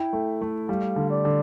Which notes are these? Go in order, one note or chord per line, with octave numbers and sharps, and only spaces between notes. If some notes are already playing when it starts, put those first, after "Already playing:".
Already playing: E4 G5
A3
A3
G3 F5
D3
D5
D3